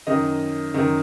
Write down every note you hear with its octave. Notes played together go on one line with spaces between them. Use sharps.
F#2 D#3 D#5
F#2 D#3